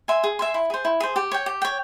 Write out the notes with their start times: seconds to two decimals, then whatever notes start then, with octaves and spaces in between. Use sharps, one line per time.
0.08 E5 G#5 C6
0.24 G#4
0.39 E5 G#5 C6
0.54 E4
0.70 G#4 C5
0.85 E4
1.00 G#4 C5
1.16 G4
1.31 C#5 G5
1.46 G4
1.62 C#5 G5